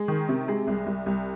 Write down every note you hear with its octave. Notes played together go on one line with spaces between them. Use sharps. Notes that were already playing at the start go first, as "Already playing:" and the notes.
Already playing: G#3
D#3
C3
G#3
C2
C2
C2